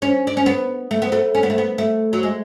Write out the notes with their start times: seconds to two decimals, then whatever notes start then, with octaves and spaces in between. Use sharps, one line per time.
0.02 C#4
0.27 D4
0.37 C#4
0.46 B3
0.91 A3
1.02 B3
1.12 A3
1.35 C#4
1.43 B3
1.50 A3
1.58 B3
1.78 A3
2.13 F#3
2.23 G#3